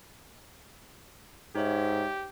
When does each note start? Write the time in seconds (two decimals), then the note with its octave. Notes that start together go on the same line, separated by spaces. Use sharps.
1.55 G#2 D#4 G4 C#5 E5